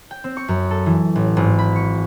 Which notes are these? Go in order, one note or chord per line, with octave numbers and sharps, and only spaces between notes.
G5
C4
C#6
F#2
A4
E3
A1
G#1
B5
C#6